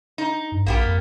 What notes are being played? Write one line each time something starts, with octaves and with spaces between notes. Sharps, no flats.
D#4
G2
A#1 A#3 B3 G4
F2